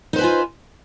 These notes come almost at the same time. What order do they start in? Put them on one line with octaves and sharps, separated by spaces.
D#4 C5 B4 G#5 F4